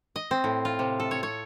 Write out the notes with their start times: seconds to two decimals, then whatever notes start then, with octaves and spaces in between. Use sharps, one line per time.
0.16 D#5
0.31 C4
0.44 A2
0.65 F4
0.79 C3
1.00 A4
1.11 C#5
1.23 C#5